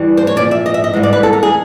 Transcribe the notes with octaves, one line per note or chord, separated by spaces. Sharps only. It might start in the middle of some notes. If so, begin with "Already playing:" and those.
Already playing: G2 E3 G3
C5
C#5
A#2 F3 D5
E5
D#5
E5
D#5
G#2 E3 G3
D5
B4
A4
A#4
G#4